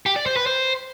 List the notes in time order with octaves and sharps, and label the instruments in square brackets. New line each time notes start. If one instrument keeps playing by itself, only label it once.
[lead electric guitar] G4
D5
C5
B4
C5